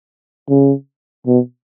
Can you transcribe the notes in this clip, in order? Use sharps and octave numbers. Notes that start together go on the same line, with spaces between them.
C#3
B2